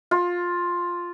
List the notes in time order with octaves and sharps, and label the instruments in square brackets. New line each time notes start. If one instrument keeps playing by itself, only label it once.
[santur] F4